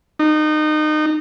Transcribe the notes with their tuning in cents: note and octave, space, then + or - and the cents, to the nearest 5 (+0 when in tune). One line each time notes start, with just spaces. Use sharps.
D#4 -25